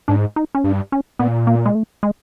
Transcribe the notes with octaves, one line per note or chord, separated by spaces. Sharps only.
G#2 D4
D#4
C#4
G2 D4
C#4
A#2 B3
A#3
G#3
A3
G#3